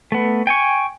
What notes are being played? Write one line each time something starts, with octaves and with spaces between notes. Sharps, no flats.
A3 B3
G5 G#5 C#6